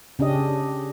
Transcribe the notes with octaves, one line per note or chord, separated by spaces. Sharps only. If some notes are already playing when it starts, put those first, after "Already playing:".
C#3 C#4 D4 G4 D#5